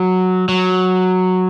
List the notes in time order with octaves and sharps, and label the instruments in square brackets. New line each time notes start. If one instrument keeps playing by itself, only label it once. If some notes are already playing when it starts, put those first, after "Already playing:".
Already playing: [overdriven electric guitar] F#3
F#3